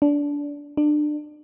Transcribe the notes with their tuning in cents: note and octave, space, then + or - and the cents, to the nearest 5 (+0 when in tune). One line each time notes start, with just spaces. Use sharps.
D4 -20
D4 +25